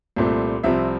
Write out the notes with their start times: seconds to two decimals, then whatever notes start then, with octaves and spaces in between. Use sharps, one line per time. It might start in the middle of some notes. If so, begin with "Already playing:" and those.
0.16 C2 A#2 A3 C4
0.63 C2 C3 F3 C4 E5